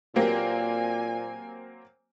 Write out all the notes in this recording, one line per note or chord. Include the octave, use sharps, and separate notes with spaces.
A#2 F#3 A#3 C4 G4 A#4 B4 G#5